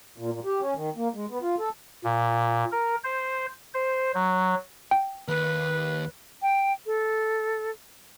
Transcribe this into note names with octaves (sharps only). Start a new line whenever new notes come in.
A#2
A#2
G4
C#4
D#3
A#3
G#3
B3
F4
A4
A#2
A#4
C5
C5
F#3
G5
D#2 B4
G5
A4